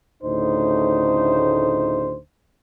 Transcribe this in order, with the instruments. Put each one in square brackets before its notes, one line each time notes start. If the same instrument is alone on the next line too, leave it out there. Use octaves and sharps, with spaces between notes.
[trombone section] D2 A2 C#3 D#4 C5